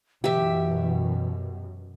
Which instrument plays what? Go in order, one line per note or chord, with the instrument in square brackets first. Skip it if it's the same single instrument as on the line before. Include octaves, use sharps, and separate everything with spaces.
[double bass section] F#2 B2 [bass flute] E3 [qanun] G4 E5